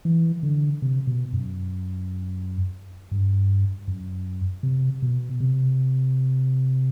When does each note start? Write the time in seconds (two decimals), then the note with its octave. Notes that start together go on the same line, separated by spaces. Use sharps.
0.05 E3
0.43 D3
0.82 C3
1.07 B2
1.33 F#2
3.11 G2
3.88 F#2
4.63 C3
5.02 B2
5.40 C3